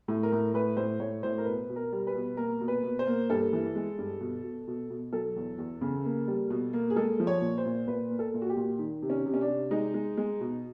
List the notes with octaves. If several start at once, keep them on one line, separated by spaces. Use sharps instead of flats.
A2
A#4
A2
A2 B4
A2 C5
A2 C#5
A2 C5
A#4
B2 B4
B2
A#4
G3
B4
B2
A#3 A#4
B2
B4
B2
C5
A#3
G2 A4
E3
G#3
G2
B2
B2
B2
B2
F#3 A4
E2
E2
C#3
A#3
G3
B2
A#3
G#4
G#3 A4
F3
C#5
A#2
C5
A#2
A#2 B4
A#3
A4
A#2
F#4
G4
A#2
D#3
C3
C#4
C3
C#4
D4
C3
G#3 D#4
G#3
G#3
B2